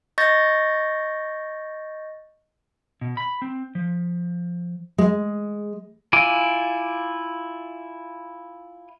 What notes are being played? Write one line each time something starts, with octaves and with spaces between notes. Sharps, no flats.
D#5 C#6 G6 A6 A#6
B2
B5
C4
F3
G#3
E4 F4 G#5 D6